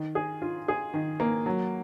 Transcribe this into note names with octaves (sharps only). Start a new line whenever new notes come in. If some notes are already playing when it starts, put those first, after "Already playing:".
Already playing: D#3
G#4
F4
G#4
D#3
A#3
F#3